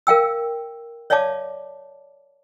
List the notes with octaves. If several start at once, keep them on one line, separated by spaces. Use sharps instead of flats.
A#4 F5 G5 E6
C#5 D5 E5 F5 A5 D6